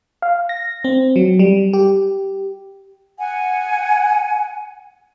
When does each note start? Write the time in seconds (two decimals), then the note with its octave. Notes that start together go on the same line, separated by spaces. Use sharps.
0.22 F5
0.49 A#6
0.84 C4
1.16 F#3
1.39 G3
1.73 G4
3.19 F#5 G#5